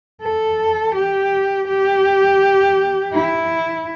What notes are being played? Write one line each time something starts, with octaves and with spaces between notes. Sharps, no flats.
A4
G4
G4
E4